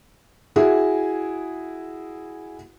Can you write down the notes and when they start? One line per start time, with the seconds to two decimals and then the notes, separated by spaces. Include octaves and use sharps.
0.56 E4 F#4 G#4